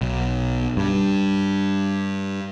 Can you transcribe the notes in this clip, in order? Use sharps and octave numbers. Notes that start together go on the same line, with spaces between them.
B1
G2